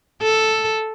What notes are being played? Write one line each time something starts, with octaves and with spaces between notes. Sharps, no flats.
A4